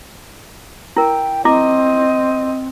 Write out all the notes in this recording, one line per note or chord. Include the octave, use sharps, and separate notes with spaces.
E4 A#4 G5
C4 E4 D#5 D6